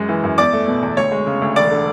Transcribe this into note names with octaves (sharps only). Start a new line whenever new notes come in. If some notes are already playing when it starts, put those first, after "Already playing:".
Already playing: F#2 G#3
E3
F#2
E2 D5 D6
A3
B2
E2
D2 C#5 C#6
G#3
C#3
D2
E1 D5 D6
D3